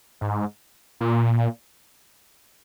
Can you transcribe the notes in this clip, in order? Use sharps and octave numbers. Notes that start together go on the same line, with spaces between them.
G#2
A#2